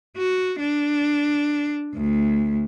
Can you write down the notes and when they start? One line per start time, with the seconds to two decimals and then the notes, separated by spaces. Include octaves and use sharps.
0.16 F#4
0.60 D4
1.94 D2